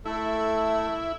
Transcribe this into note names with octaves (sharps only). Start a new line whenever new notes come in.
A3 E4 A4